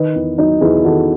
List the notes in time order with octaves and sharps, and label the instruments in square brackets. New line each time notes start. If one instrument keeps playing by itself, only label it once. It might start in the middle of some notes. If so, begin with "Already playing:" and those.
Already playing: [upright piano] D#3 B4 D#5
E2
F#3 D#4
E2 E4 G#4
D#3 F#4 A4